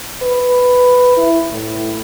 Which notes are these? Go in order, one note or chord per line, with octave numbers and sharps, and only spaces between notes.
B4
E4
A2